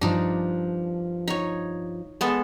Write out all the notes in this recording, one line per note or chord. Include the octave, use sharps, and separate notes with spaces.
G2 F3 D4 D#4
D#4 C#5
G#3 B3 A4